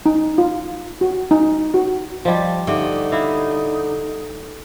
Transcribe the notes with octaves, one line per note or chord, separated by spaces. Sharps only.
D#4
F4
F#4
D#4
F#4
F3 G3 D5 D#5 F5
D3 D#4 G4 G#4 E5
E4 E5 F5 C6